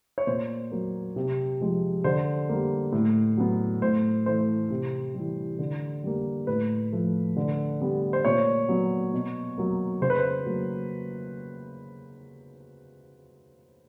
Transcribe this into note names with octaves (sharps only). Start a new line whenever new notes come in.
C#5
A#2 C5
F#3 A#3
C3
F3 G#3
D3 C5
G3 A#3
A2
F#3 B3
A2 C5
E3 A3 C5
C3
E3 G3
D3
G3 A#3
A2 B4
F3 A3
D3
G3 B3
C5
A#2 C#5
F#3 B3
B2
F#3 A#3
C#3 C5
B4
C5
F#3 A#3